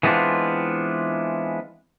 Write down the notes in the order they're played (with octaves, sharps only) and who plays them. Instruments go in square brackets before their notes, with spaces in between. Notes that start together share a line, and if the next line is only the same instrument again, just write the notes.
[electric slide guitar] E3 G#3 B3 C4 D4 F4